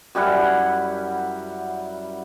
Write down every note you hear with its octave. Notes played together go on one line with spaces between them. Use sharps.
F#2 G3 E4 F#5